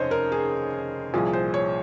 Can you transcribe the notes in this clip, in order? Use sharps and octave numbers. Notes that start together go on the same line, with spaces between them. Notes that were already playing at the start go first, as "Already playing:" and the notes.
Already playing: F1 D#2 C#3 C5 C#5 D#5
A#4
G#4
C2 A#2 F3 G#4
C5
C#5